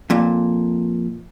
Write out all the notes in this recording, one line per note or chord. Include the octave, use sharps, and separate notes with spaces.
F2 A#2